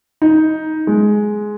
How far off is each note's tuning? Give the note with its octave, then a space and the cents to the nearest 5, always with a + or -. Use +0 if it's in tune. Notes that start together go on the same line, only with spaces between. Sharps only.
D#4 +10
G#3 +10